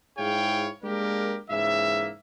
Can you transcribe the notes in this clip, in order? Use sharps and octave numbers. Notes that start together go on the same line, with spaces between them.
G#2 E4 G#4 C#5 F5 G5
G#3 A#3 D4 G4 A#4
G#2 C#3 E3 A#3 E5